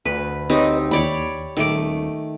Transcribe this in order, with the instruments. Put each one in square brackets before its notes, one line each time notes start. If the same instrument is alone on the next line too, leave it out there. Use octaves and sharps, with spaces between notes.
[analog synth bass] D2 [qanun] B4
[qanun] C4 D#4 G4 [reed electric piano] B4 C#5 D#5
[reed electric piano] D#2 [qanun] C#5 D5 B5
[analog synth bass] D#1 [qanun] D#3 A3 D6